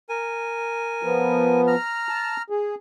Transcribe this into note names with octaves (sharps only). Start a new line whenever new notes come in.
A#4 G#5
F3 B3
A#5 F6
A5
G#4